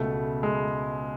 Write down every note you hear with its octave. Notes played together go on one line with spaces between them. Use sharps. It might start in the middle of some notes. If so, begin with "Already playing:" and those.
Already playing: C#2 B2 A3
G#3